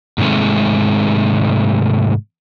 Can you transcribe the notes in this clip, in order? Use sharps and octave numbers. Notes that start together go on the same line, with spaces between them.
G#2 C3 D#3 G#3 A3